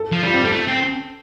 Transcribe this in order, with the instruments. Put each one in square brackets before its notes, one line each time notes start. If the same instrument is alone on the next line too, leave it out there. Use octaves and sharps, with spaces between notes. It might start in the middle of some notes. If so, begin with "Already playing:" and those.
Already playing: [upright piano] A4
[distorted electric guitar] F3
[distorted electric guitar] G3 [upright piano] F4
[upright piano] C4
[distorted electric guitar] G3 [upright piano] A4
[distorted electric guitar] A3
C4